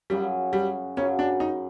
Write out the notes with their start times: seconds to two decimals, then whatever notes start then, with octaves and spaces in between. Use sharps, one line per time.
0.10 F#2 C#3 F#3 G3
0.53 G3
0.97 F#2 C#3 F#3 C#4
1.19 D4
1.40 D#4